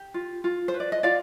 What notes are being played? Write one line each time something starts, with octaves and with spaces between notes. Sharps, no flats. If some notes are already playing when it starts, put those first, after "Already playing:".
Already playing: G4
F4
F4
C5
B4
D5
D#5
F4 D5 F5